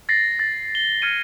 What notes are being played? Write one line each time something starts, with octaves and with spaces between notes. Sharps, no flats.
A6 A#6 C7
A6
G7
F6 G#6 A#6 C#7 D#7